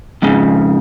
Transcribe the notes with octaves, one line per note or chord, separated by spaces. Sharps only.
F2 G#2 C#3